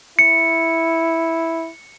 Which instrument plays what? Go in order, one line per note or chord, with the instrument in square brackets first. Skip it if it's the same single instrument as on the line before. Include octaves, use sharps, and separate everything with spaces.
[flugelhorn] E4 [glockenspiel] C#7